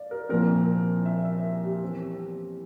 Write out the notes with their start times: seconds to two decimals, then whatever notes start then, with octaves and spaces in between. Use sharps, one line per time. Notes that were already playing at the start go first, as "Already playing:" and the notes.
Already playing: D5 F5
0.11 A#4
0.29 C2 A#2 F3 C4 A#4
1.06 E5
1.25 E5
1.63 G4
1.82 E2 E3 G3 C4